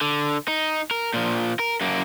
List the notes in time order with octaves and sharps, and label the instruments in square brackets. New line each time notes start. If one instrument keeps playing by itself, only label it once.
[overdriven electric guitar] D3
D#4
A#4
A#2 F3
A#4
F#2 A#3